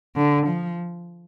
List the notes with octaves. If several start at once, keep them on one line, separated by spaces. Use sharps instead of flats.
D3
F3